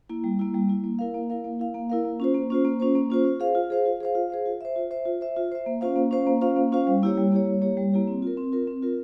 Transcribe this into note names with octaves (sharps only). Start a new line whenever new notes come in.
A#3 E4
G3
A#3 E4
G3
A#3 E4
A#3
E4 A#4 F5
A#3
E4 A#4 F5
A#3
E4 A#4 F5
A#3
E4 A#4 F5
A#3
C#4 F4 C5
A#3
C#4 F4 C5
A#3
C#4 F4 C5
A#3
C#4 F4 C5
F4
G#4 C5 F5
F4
G#4 C5 F5
F4
G#4 C5 F5
F4
G#4 C5 F5
F4
C5 E5
F4
C5 E5
F4
C5 E5
F4
C5 E5
A#3
C#4 F4 C5 F5
A#3
C#4 F4 C5 F5
A#3
C#4 F4 C5 F5
A#3
C#4 F4 C5 F5
G3
A#3 E4 G4 C#5
G3
A#3 E4 G4 C#5
G3
A#3 E4 G4 C#5
G3
A#3 E4 G4 C#5
C4
F4 A#4
C4
F4 A#4
C4
F4 A#4